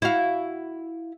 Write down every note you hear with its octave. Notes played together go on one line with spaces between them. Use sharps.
E4 F#4 F5